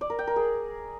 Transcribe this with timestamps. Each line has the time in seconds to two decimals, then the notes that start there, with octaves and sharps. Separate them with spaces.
0.01 D5
0.10 A#4
0.19 G5
0.27 A#4
0.36 G#4